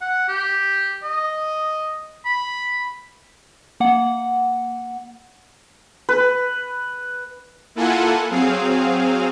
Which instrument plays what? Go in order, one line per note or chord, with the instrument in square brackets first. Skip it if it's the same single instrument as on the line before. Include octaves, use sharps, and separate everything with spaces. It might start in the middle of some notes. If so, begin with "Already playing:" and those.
[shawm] F#5
G4
D#5
B5
[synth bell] A#3 F#5
[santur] B4
[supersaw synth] A#3 E4 F4 A4 F#5 G#5
F#3 C4 G#4 F5